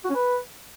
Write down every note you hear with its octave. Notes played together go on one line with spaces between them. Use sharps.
F#4
C#4
B4